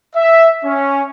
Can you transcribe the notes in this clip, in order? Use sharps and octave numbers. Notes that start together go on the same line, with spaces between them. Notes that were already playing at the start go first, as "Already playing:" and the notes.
E5
C#4